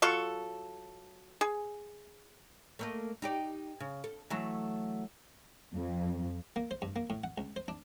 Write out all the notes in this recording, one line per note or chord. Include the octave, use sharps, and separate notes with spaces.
F#3 F4 A4 C#6
G#4
A3 A#3 D#5
D#4 G4 D5
C#3
A4
E3 F#3 A3
F2
A#3
C5
G2
A#3
A2
F#5
C#2
C5
D4